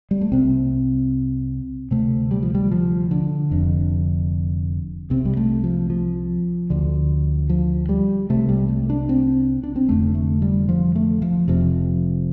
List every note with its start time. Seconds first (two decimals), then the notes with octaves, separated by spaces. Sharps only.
0.11 G3
0.21 A3
0.32 C2 C3 C4
1.91 D2 C3 A3
2.31 G3
2.43 F3
2.55 G3
2.71 F3
3.11 D3
3.51 F1 F2 D3
5.10 C2 C3 C4
5.25 G3
5.37 A3
5.64 F3
5.90 F3
6.70 D2 D3
7.49 F3
7.89 G3
8.30 C2 C3 A3
8.49 G3
8.69 A3
8.90 D4
9.09 C4
9.63 D4
9.76 C4
9.88 F1 F2 D3 A3
10.15 A3
10.42 G3
10.69 F3
10.95 A3
11.22 F3
11.48 F1 F2 C3 F3